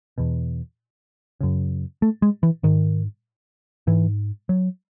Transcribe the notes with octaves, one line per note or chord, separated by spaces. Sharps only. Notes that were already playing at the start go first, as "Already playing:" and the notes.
E2 B2
F#2 C#3
A3
G#3
E3
G#2 D#3
G#2 E3
F#3